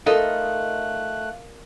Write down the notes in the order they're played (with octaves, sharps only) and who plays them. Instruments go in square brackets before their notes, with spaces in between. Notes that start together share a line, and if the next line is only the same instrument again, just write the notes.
[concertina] A3 F#6 [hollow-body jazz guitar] D#4 A4 D#5 [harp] F4 A#4 [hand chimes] F5